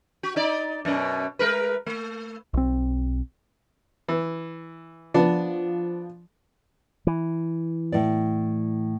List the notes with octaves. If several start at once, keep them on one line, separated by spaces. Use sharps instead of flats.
F#4
D#4 D5
F#2 B2 C#4
G#3 A#4 B4
A3
B1 C4
E3
F3 B3 D4
E3
A2 D5